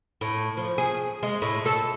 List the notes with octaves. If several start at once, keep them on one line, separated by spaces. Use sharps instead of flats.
A2
F3
G#4
G#3
A2
A4